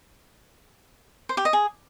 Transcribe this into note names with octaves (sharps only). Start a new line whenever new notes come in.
C5
G4
D#5
G#4